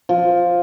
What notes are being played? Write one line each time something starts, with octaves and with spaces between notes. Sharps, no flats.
F3